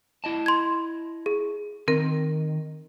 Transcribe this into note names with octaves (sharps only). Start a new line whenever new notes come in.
E4 D#5 A5
C6 G#6
G#4
D#3 C4 A#4